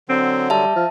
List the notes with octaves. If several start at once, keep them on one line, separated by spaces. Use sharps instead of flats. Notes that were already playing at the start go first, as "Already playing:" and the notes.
D3 F#3 C4
G3 E5 A5
F3